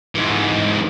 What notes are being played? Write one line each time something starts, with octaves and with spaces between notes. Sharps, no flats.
G#2 E3